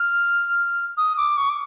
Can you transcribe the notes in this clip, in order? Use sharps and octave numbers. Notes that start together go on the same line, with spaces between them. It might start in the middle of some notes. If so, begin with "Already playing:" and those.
Already playing: F6
D#6
D6
C#6
D6